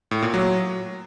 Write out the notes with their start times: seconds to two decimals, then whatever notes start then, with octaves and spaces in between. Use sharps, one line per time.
0.11 A2
0.22 A#2
0.34 F#3